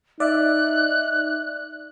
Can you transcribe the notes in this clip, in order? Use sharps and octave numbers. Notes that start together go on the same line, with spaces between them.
D#4 D5 E5 F#6